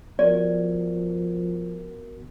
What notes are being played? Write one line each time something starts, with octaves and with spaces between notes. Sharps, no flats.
F3 B3 F#4 A#4 D5